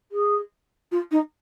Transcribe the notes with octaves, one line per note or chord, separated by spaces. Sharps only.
G#4
F4
D#4